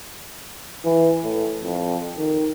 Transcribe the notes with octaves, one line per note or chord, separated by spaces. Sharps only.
E3
A2
F2
D#3